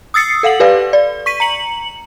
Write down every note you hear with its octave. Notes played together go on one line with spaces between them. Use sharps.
D#6 E6 A6 C7 C#7
A4 F5 F#5 F#7
G4 A4 B4 D5 F5
D5
C#6 B6 D#7
A#5 C#7 F#7